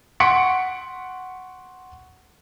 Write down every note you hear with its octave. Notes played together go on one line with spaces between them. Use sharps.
F#5 C6 C#6 B6 C#7 D7